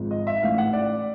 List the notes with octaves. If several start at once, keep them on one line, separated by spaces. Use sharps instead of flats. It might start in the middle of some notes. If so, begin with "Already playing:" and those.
Already playing: G#1 G#2 F3
D#5
E5
A1 A2 E3 F5
F#5
D5